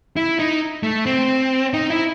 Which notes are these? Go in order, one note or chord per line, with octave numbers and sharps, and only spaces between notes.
E4
D#4
A3
C4
D#4
E4